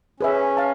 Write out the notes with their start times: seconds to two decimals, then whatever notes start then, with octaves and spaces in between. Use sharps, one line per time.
0.20 C#4 G#4 B4 E5
0.57 F5 A5